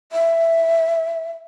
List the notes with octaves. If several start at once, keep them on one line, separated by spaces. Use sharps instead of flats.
E5